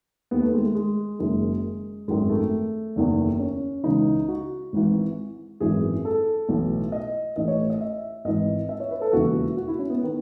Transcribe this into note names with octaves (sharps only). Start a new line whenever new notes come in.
D#2 D#3 B3
A3
G#3
G#3
G#3
F#1 F#2 D#3 G#3
G#1 F#2 D#3 G#3
A3
F#1 E2 D#3
C#4
C#2 C#3 E3 D#4
F#4
G#1 G#2 E3
G#1 F#2 E3 G#4
A4
B1 A2 E3
D#5
A1 A2 E3 D#5
C#5
D#5
E5
G#1 G#2 E3 D#5
E5
C#5
B4
A4
E1 D#2 C#3 E3 F#4
F#4
E4
C#4
B3
D#3